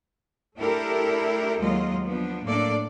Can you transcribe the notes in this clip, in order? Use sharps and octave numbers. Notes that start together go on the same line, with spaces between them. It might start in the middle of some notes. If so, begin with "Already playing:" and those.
A3 D4 E4 G4 A4 A#4
D#2 F#3 G#3 F4 D#5
F3 B3 D4
A2 A#3 D4 A4 D5